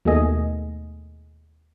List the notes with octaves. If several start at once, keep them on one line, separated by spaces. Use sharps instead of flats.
D#2 B2 D#3 A3 G#4 D#5